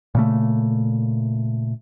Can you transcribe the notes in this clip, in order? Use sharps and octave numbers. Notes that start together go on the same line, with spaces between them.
A#2 C#3 A3